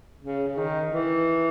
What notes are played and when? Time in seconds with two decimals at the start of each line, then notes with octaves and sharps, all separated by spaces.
0.23 C#3
0.48 C#3
0.58 D#3
0.91 E3